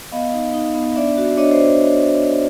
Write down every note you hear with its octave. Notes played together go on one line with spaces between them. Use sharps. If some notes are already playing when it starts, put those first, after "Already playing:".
B3 D#5 F5
D#4
D#4
B3
D4 D5 E5
F#4
D4 C#5 D#5
C5 D5